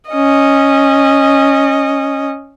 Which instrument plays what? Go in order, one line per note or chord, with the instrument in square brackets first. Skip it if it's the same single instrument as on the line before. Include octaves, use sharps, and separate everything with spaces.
[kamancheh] C#4 D#5